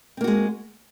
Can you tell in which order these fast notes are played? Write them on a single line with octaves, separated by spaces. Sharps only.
C4 A#3 F#4 G#3